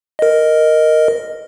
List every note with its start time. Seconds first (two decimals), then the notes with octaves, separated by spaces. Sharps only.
0.19 A#4 D#5